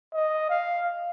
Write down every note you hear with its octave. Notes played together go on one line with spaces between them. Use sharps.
D#5
F5